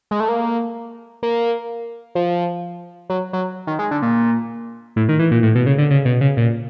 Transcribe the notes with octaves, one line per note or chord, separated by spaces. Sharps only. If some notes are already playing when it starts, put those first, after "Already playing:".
G#3
A3
A#3
A#3
F3
F#3
F#3
D#3
G#3
D3
A#2
A2
D#3
E3
A#2
A2
B2
C#3
D3
C#3
B2
C#3
A#2